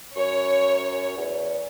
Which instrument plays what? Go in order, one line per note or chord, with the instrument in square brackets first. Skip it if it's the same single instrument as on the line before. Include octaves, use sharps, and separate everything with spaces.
[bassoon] F#2 [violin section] C#5
[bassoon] E2